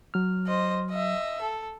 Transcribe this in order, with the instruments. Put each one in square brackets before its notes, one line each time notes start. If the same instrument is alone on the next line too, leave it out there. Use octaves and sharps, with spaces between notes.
[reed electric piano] F#3 F6
[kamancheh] C5 D#5
D#5 E5
A4